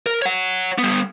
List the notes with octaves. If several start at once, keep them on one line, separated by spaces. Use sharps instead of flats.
A#4
C#5 F#5
G3 B3